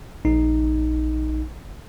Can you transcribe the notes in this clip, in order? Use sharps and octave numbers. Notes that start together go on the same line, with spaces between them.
A#1 D#4